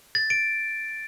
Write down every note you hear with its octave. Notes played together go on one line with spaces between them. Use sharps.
A6
D7